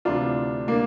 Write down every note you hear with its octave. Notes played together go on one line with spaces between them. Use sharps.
D2 C3 E3 D4 F4
A#3 D4